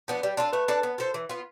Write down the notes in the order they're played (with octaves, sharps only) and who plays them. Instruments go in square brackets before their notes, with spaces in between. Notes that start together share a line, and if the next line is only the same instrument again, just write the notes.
[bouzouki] F3 B3 D4
G3
D4 F4 A4
[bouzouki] A3 [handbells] B4
[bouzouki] D4 A4 D5
B3
F4 A4 C5
E3
B3 F4